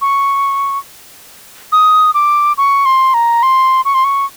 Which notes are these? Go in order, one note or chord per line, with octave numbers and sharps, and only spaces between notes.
C#6
D#6
D6
C#6
C6
A#5
C6
C#6
C6
C#6